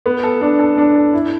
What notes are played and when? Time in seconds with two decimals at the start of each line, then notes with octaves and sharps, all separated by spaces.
0.06 B3
0.23 A4
0.41 D4
0.59 A4
0.78 D4
0.95 A4
1.13 E4